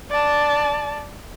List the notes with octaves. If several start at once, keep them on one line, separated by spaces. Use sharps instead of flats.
D5 A5